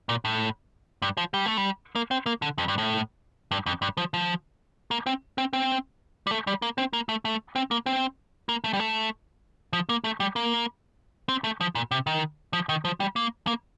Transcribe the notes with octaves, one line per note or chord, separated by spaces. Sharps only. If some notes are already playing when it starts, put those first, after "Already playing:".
A#2
A2
G2
F3
G3
A3
G3
A#3
C4
A#3
D3
F2
G2
A2
G2
F2
G2
F3
F3
A#3
C4
C4
C4
G3
A3
G3
A#3
C4
A#3
A3
A3
C4
A#3
C4
A#3
A3
G3
A3
F3
A#3
A3
G3
A#3
C4
A3
F3
A#2
C3
D#3
F3
D#3
F3
G3
A#3
A#3